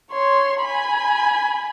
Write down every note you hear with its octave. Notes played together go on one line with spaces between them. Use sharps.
C#5 C6
G#5 B5